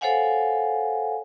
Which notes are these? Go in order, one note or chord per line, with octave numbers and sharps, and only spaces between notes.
A4 C5 C#5 F5 F#5 G#5